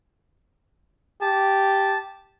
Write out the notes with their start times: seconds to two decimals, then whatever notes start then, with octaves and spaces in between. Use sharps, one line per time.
1.21 G4 A5